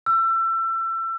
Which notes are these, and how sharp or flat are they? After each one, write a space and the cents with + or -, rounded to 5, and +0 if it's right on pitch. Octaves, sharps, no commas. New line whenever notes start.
E6 +30